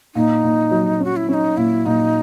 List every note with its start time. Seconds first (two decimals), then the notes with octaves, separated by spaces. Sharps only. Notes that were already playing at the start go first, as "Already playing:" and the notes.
0.15 A#2 D#4
0.43 A#2
0.71 F#3
1.00 C#4 F#4
1.16 E4
1.29 C#4 E4
1.34 D#4
1.57 A#2 E4
1.85 A#2 D#4